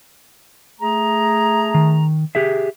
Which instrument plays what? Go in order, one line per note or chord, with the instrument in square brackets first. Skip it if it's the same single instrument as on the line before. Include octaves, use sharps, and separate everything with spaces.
[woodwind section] A3 G#4 A#5
[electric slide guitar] D#3
G4 G#4 E5